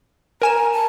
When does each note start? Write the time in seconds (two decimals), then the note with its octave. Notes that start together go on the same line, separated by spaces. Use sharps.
0.42 A#4 G#5 A#5 E7
0.74 A5